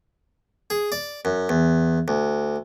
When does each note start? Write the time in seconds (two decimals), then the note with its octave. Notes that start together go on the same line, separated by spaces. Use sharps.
0.70 G#4
0.92 D5
1.25 F#2
1.49 E2
2.08 D2